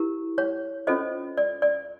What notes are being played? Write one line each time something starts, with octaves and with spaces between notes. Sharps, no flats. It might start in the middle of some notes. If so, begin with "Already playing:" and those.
Already playing: E4 G4 A#4
C#5
C#4 F4 A4 C5 D#5
D5
D5